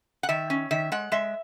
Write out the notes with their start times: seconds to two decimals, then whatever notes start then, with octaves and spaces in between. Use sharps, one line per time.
0.23 F#5
0.29 D#3 E5
0.50 C#4
0.71 D#3 E5
0.92 G#3 F#5
1.12 G#3 E5